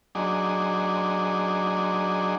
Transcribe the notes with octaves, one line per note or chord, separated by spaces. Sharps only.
F#3 D4 D#4 G#4